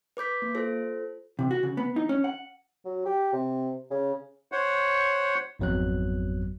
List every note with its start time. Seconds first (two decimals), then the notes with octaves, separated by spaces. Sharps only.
0.17 B4 D6 G6 B6
0.42 A#3
0.55 F4 A4 C5
1.39 C3
1.51 F#4
1.63 C#3
1.77 B3
1.96 D#4
2.09 C#4
2.24 F#5
2.85 F#3
3.06 G4
3.33 C3
3.91 C#3
4.52 C5 C#5 F#5
5.59 G#1 F2 F#3 B3 F#6